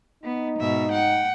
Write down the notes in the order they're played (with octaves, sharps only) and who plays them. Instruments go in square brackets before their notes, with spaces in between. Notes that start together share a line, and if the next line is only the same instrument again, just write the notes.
[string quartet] B3 [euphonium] D#4
[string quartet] G#2 B2 E5
F#5 G5